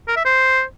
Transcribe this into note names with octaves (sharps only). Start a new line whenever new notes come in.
A#4
E5
C5